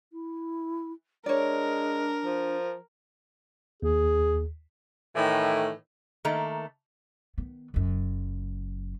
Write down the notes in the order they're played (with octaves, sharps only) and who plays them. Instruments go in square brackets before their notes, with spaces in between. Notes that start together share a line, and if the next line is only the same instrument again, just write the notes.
[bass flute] E4
[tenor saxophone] G#3 [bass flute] D4 [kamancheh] A#4 [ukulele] C#5 D5
[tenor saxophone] F3
[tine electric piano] D#2 [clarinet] G#4
[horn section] A2 D#3 E3
[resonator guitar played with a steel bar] D#3 A3 A#3
[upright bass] D#3 B3
F#1 F#2